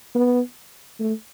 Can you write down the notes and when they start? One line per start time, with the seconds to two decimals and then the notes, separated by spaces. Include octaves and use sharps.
0.15 B3
1.00 A3